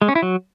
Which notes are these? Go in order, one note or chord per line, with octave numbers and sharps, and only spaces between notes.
G#3
C#4
E4
F#3